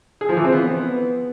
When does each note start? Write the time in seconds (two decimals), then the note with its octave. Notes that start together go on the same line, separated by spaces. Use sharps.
0.21 G#4
0.29 F3
0.37 E3
0.45 C4
0.52 B3